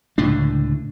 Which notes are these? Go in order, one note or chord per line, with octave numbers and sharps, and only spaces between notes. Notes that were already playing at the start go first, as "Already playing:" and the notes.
C#2 A2 D3 D4